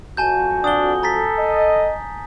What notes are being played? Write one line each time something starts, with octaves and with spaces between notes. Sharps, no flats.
F2 F#4 G#5 A5 G6
D4 D#6 G7
A4 A#5 A6 B6
D#5